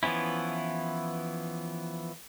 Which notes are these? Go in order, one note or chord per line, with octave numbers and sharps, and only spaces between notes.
E3 F3 B3 C#4 E4